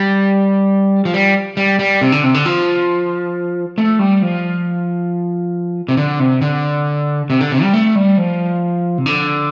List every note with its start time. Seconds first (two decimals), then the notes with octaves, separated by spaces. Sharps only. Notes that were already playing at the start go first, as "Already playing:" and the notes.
Already playing: G3
1.05 F3
1.14 G3
1.57 G3
1.79 G3
2.01 C3
2.12 D3
2.23 C3
2.34 D3
2.46 F3
3.78 A3
3.99 G3
4.22 F3
5.88 C3
5.97 D3
6.20 C3
6.42 D3
7.30 C3
7.41 D3
7.52 C3
7.62 G3
7.74 A3
7.95 G3
8.18 F3
8.98 C3
9.06 D3